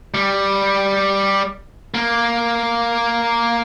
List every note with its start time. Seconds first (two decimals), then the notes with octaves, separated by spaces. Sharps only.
0.14 G3
1.94 A#3